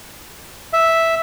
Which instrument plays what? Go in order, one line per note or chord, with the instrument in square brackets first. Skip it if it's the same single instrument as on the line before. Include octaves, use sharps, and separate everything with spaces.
[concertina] E5